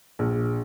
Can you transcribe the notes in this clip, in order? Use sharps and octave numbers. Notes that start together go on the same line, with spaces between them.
A#1